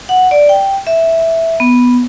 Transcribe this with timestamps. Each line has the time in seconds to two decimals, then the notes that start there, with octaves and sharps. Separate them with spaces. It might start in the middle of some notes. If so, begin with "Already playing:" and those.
0.09 F#5
0.31 D5
0.49 G5
0.87 E5
1.60 B3